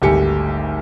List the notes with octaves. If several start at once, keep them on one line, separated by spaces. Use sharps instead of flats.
G#1 D2 G3 G4 G#5 C#7